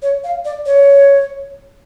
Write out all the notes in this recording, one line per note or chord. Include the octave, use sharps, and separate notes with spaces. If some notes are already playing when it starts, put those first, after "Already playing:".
C#5
F5
D5
C#5